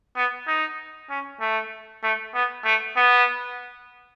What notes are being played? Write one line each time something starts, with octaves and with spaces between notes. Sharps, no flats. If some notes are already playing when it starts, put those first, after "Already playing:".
B3
D#4
C#4
A3
A3
B3
A3
B3